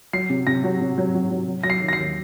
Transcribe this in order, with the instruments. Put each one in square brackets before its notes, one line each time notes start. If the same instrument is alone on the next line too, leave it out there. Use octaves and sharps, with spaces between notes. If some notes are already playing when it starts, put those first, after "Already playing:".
[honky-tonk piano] F#3 [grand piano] C7
[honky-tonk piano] C3
[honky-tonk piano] C3 [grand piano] A#6
[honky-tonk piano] F#3
C3
F#3
F#3
F#3
F#3
[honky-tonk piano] F#3 [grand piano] A#6
[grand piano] C7
[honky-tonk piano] D#3
[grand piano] A#6
C7
[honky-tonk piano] D#2